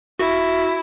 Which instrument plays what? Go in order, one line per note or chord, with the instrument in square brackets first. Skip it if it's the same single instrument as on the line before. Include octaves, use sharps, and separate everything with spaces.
[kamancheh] E4 [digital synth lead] F#4